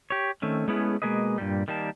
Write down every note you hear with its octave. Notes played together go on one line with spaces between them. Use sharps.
G4 C#5
D#3 A3 C4 C#4
G#3 A3 B3 C#4 E4 G#4
B2 G#3 A#3 G#4 B4 D#5
G2 A#2 G3
D#3 G3 A#3 A5